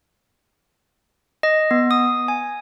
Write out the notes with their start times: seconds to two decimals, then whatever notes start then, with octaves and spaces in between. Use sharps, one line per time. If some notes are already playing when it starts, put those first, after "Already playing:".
1.43 D#5
1.71 B3
1.91 D#6
2.28 G#5